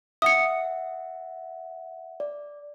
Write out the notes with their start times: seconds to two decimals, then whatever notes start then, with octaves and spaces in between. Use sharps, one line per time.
0.22 E5 F#5 D#6 C#7
2.20 D5